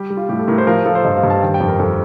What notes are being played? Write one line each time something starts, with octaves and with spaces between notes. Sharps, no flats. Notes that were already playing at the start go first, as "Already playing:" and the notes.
Already playing: G3 G4
G3
F4
A2 G4
A4
A2 A#4
C5
F3 A#4
F3 A4
C5
G2 D#5
F5
G2
A5
D#3 G5
G5
F2
A#4
F2 A4